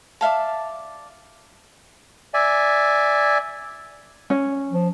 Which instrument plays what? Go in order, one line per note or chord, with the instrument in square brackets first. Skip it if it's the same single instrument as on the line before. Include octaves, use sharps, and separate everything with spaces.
[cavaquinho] D5 E5 F5 A5
[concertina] D5 E5 G#5
[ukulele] C#4
[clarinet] F3